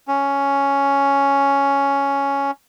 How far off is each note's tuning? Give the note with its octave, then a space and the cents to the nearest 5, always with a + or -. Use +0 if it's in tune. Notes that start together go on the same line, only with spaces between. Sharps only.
C#4 +5